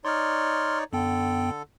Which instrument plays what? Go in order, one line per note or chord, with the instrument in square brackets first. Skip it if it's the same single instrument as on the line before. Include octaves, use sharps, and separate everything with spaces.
[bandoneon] D#4 C#5 D5 [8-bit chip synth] C6 F6
[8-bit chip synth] F#2 B3 G5 [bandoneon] D3 A4